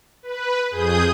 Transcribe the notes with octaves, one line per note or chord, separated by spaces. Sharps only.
B4
F2 G#4 D#6 G6